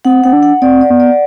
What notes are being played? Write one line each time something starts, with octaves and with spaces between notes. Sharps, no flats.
C4 F#5
C4 F#5
D4
F#5
C4 D5
D5
B3
D5